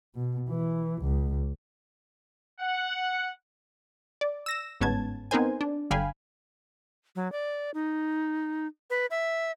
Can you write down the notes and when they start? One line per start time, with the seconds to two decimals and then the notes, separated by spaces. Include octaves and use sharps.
0.15 B2
0.49 E3
1.02 C#2
2.60 F#5
4.21 D5
4.46 E6 A#6 E7
4.81 G1 G#2 B3 C#4 A5 G#6
5.31 B3 C4 D#4 A#4 C5 G#5
5.61 D4
5.91 G1 D3 F5 G5 G#5 B5
7.16 F#3
7.32 D5
7.74 D#4
8.90 B4
9.11 E5